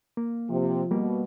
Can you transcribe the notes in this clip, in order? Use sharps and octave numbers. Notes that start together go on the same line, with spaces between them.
A#3
C3 F3
B2 G3 A#3